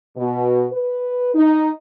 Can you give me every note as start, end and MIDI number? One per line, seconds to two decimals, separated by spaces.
0.17 0.66 47
0.72 1.34 71
1.34 1.71 63